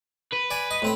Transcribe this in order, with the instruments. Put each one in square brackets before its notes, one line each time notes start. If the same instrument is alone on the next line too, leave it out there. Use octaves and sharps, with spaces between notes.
[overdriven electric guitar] B4
[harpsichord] D5 G#5
D#5
A2 C4 B5